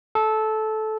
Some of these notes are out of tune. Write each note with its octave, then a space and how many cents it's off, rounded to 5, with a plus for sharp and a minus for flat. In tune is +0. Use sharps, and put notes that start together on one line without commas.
A4 -15